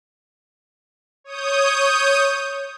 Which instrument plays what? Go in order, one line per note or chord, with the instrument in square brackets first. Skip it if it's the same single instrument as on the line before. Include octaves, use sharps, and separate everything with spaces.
[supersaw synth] C#5 D#6 G6